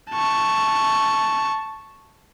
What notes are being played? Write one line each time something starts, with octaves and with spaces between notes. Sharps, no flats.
A5 C#6